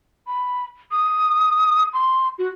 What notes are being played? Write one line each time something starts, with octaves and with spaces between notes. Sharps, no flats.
B5
D#6
C6
F#4